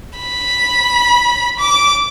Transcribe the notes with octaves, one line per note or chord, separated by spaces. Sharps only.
B5
D6